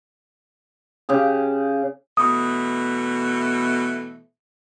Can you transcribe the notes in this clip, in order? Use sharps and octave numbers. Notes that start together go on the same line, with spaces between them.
C#3 G4 G#4
B2 E3 A3 D#6